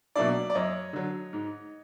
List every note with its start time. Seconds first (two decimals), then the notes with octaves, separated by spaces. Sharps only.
0.16 B2 F#3 A#3 D4 D5 E5
0.50 D5
0.55 F#2 C#5 D#5
0.93 D3 F#3
1.33 G#2